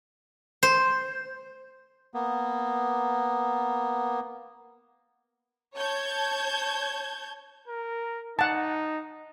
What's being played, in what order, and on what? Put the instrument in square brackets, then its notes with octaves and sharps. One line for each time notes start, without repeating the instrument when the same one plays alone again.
[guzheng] C5
[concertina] A#3 B3
[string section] C#5 A5 G6 G#6
[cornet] A#4
[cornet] D#4 [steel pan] F#5 A5